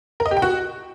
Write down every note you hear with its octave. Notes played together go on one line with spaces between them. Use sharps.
A#4
D#5
G4
G5
F#4